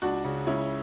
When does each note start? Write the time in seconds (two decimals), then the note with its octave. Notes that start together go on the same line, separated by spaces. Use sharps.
0.02 C#2 D4 F#4
0.24 C#3
0.47 C#2 C#4 E4